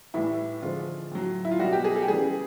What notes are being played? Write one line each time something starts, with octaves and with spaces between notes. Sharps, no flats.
A2 E3 G3 E4
D3 F3 G#3 F4
A2 F#3
E4
F4
B2 G3 F#4
G4
G#4
A4
G4
C#3 E3 G3 G#4